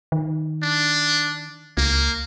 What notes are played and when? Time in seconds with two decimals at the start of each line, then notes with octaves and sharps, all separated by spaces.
0.12 D#3
0.63 D4
1.77 C#2 A#3